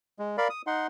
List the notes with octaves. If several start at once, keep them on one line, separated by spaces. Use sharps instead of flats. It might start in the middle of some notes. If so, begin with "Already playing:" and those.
G#3
A#4 D5 F5 B5
D#6
D#4 F#5 C6